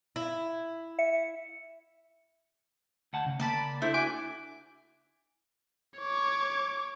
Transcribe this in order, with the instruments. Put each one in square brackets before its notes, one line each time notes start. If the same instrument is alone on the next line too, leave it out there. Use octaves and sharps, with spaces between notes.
[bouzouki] E4
[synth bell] E5 C#7
[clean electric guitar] D2 F#5 A5
C#3
[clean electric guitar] C#3 A#3 [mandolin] D5 A5 B5
[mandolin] A3 C5 [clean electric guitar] D4 E4 E5
[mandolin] F#4 G#5 D6
[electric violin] C#5 D6